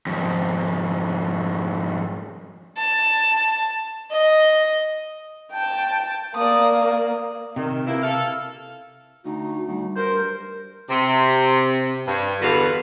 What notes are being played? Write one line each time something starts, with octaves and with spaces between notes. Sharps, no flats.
F2 G#2
A5
D#5
G5 A5
A#3 D5 D#6
C3 D#3
B2 A#3 E4
A4 F5
D2 D#4 F#4
D2 G3
G2 A#4 C5
C3
G2
E2 D3 B3 F#4 B4 F5